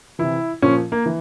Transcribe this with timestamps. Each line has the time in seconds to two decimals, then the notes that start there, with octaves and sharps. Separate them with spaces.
0.19 C3 E3 E4
0.62 A#2 F3 C#4
0.92 A#3
1.06 E3